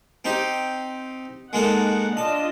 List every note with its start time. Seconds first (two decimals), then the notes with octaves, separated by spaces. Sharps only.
0.25 C4 D#4 G4
1.53 G#3 A#3 D#4 A4 F#5
2.17 D4 F4 D#5 A5